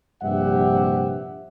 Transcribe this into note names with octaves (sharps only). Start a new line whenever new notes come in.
A#1 G2 C3 G4 E5 F#5